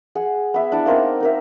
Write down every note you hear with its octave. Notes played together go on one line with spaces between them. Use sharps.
G#4 F#5
B3 E5
D4 E4 D5 F#5
A#3 C4 D#4 A#4
D#4 A#4 E5